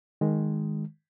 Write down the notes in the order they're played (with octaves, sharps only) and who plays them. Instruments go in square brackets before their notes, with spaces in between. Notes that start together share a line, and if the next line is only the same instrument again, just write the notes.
[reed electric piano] D#3 G#3